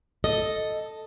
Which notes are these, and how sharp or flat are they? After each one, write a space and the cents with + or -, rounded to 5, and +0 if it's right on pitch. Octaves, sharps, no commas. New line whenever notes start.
A4 +0 D#5 +0